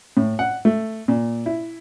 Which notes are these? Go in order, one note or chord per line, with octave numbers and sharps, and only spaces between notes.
A2
F#5
A3
A#2
E4